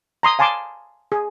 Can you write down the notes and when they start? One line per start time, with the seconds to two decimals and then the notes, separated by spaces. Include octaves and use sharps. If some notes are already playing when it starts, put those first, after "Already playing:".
0.23 A#5 C6 D#6
0.39 F5 G#5 A5 C6 D6
1.12 G#4